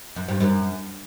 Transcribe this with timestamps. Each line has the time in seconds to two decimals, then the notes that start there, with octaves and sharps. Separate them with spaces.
0.16 F#2
0.29 G2
0.40 F#2